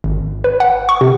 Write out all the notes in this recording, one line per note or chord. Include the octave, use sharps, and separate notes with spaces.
G#1
B4
F#5
C#6
C3